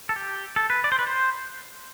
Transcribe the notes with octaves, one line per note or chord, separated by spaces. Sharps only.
A4
G4
A4
B4
D5
C5
B4
C5